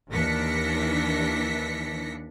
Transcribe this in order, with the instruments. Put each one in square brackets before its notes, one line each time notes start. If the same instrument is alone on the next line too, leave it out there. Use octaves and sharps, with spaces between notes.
[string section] D#2 E3 D4 A#6 B6 C#7